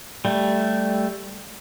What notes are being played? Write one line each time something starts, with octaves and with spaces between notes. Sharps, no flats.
G3 A3